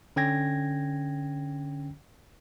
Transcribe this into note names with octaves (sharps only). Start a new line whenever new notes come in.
D3 C#4 G5 G#6 A#6